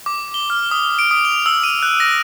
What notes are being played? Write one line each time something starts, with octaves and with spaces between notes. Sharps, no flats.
D6
G7
F6
D#6
D7
D#6
F7
E6
D#7
F#6
A#6